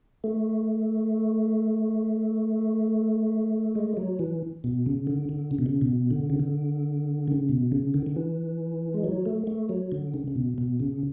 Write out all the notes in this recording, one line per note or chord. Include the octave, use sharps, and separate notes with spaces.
A3
G#3
F#3
E3
B2
C#3
D3
D3
C#3
B2
C#3
B2
D3
C#3
D3
C#3
B2
C#3
D3
D3
E3
G#3
F#3
A3
A3
F#3
D3
C#3
C#3
B2
B2
C#3